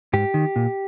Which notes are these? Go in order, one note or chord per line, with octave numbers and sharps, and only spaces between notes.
G#2 G4
D#3
A#2